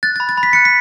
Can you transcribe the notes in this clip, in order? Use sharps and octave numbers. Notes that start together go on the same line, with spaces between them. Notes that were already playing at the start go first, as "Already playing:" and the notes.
F#6 A6
A6
B5
A6
B5
B6
F#6 C#7
B6